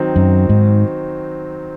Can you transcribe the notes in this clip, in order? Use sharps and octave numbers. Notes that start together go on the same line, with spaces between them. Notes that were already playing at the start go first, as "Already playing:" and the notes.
Already playing: D#3 F#3 C4 D#4
F#2
G#2